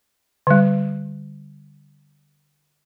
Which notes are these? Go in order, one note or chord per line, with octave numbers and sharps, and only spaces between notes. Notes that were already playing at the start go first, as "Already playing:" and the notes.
D3 G3